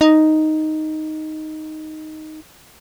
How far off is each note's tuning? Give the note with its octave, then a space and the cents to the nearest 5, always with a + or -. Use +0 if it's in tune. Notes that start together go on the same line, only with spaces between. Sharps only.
D#4 +0